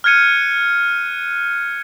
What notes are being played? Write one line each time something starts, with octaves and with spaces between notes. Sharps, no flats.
F6 F#6 G#6 C#7 D#7